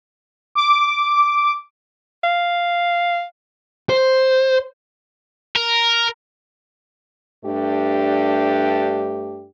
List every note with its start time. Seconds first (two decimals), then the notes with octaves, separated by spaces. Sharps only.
0.55 D6
2.24 F5
3.89 C5
5.56 A#4
7.45 G2 A3 D4 G4